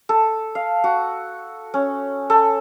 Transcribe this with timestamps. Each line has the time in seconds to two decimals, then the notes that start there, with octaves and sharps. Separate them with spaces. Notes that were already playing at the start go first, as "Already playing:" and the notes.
0.09 A4
0.55 F5
0.84 F#4
1.74 C#4
2.30 A4